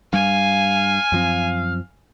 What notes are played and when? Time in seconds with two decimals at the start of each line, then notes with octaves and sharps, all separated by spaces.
0.13 G2 G3 F5 G#5
1.12 F#2 F3 C4